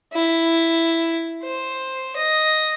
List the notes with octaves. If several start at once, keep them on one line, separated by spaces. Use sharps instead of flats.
E4
C5
D#5